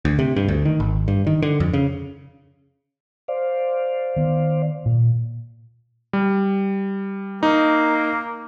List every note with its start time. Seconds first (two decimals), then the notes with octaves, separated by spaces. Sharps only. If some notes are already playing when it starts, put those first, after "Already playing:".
0.05 D2
0.19 C3
0.36 G2
0.48 D2
0.65 D#3
0.80 G#1
1.08 G2
1.27 D#3
1.42 D3
1.60 F2
1.73 C#3
3.28 C5 D5 F5
4.16 D#3 B3
4.86 A#2
6.13 G3
7.43 A#3 D#4